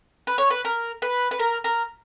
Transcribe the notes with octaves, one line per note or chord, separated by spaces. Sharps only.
B4
C#5
B4
A#4
B4
B4
A#4
A#4